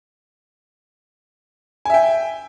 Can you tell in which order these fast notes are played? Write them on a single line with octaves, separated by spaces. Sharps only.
G#5 E5 G5